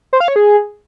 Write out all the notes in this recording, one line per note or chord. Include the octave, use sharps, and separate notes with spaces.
C5
F5
C#5
G#4